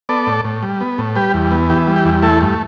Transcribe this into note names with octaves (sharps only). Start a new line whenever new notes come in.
B3 A4 D5
A2
A2
G3
B3
A2
G3 G4 B4
E2
B3
E3 G4
G3
G4
E2
A3 E4 A4
G2